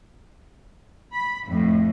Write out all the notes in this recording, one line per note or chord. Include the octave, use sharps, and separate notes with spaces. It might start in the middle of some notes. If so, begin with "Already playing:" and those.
B5
F2 A2